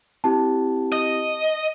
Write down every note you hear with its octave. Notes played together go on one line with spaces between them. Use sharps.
C4 E4 G4 A5
D#5